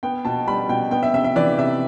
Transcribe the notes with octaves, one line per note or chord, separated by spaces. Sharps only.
B3 G5
B2 A5
G3 B5
B2 G5
B3 G5
E5
C3 E5
E5
E3 D5
C3 E5